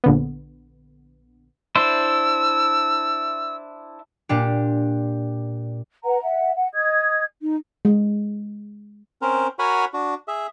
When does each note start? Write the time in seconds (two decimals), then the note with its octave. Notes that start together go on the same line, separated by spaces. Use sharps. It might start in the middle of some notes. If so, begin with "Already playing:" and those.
0.04 A#1 D3 B3
1.75 D4 E4 C5 E6
4.29 A#2 D4 G4
6.04 B4 F#5 A#5
6.22 E5 F#5
6.56 F#5
6.74 D#5 D#6 G#6
7.42 D#4
7.85 G#3
9.22 C4 C#4 A#4 C5
9.59 F#4 A#4 C#5 F#5 G#5 B5
9.94 D4 F#4
10.28 G#4 E5